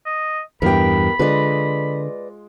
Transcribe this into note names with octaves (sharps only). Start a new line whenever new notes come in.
D#5
E2 G2 B3 E4 G4 A#4 G5 B5
D3 G#3 F4 B4 D5 D#5